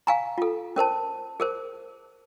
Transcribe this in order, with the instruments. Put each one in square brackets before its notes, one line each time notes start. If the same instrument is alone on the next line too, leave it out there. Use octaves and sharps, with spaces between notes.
[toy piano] F5 G#5 A#5
F4 A4
C#4 A#4 C5 A5
G#4 A#4 C5